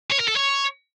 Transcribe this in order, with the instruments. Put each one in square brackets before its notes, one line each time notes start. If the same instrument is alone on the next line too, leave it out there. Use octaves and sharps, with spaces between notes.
[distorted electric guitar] C#5
A#4
A4
C#5